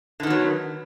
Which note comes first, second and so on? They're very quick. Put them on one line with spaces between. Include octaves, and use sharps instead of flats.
D3 D#3 B3 F#3